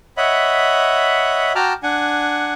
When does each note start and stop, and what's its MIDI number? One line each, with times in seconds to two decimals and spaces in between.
0.17 1.53 73
0.17 1.53 75
0.17 1.53 76
0.17 1.53 78
0.17 1.53 83
1.55 1.73 66
1.55 1.73 79
1.55 1.73 81
1.55 1.73 82
1.55 1.73 86
1.55 1.73 89
1.83 2.54 62
1.83 2.54 78
1.83 2.54 80